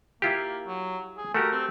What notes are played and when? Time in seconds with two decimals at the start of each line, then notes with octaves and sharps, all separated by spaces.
0.22 A#3 E4 F4 G4
0.67 F#3
1.18 G#4
1.35 A3 F#4 G4 A#4
1.52 C4